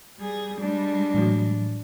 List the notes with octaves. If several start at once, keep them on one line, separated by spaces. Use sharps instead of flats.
G3 G#4
G3 G#3 D4
A2 E3 F#3